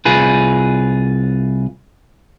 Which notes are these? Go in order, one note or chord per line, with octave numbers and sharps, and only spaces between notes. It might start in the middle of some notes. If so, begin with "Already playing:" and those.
C2 F4 G#4 B4